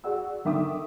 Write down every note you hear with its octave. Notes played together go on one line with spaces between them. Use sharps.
F#4 G#4 D5 F#5 E6
D3 D#3 E5 G5 D6 D#6